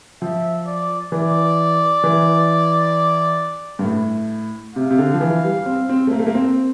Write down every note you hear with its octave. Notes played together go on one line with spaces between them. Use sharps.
F3 E5
D5
E3 D5
E3
G2
A2
C3 F5
C3
D3
F3
E3
G3
C4
C4
A3
A#3
A3
A#3
C4